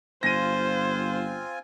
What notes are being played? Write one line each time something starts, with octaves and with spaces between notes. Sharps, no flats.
G1 C4 F4 C5 G#5 A#6 D#7